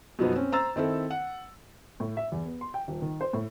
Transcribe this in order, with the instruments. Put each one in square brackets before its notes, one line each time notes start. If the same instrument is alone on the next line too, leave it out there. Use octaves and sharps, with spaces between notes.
[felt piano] F#2 B2 F3 B3 D#4
C4 C#4
C5 A#5 E6 A6
D#3 C4 E4 A4
F#5
[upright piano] A2
E5
E2
B3
C6
G5
D#1
D#3
C5
A2